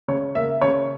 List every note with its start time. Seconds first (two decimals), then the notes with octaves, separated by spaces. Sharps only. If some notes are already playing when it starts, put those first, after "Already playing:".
0.08 C#3 C#5
0.35 A#3 E5
0.61 C#3 C#5